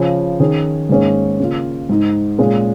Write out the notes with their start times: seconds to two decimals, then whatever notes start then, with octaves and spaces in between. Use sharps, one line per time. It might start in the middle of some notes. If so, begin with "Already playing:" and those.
Already playing: C#3 F3 C#4
0.40 D#3 C#4 G#4
0.89 G#2 D#3 A#3 C#4 G#4
1.40 C#3 A#3 F4
1.89 G#2 G#3 D#4
2.38 A#2 G#3 C#4 G#4